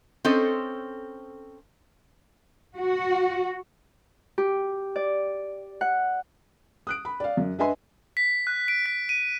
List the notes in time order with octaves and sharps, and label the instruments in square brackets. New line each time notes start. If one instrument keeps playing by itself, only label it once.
[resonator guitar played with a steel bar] C4 C#4 A4 C5 D#5
[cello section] F#4
[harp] G4
D5
F#5
[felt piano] D#6 F#6 D7
B5
D5 F5
F#2
D4 B4 D#5 E5 G#5 C6
[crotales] B6
F#6
D7
B6
D#7